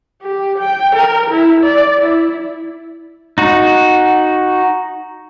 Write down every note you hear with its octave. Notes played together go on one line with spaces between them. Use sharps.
G4
G5
A#4
E4
D5
E4
D#4 F#4